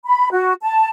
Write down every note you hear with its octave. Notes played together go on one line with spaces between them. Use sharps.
B5
F#4
A5